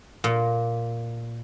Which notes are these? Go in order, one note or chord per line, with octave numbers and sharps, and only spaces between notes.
A#2